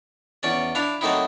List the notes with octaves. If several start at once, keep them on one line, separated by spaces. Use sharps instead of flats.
E2 C#4 D5
D4 E4 F5
F#3 A3 A#3 C4 D#4 E4